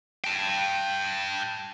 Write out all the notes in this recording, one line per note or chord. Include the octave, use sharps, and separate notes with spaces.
G5 A5